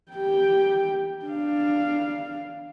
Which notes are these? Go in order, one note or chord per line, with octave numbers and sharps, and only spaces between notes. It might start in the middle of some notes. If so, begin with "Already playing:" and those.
G4 G5
D4 F5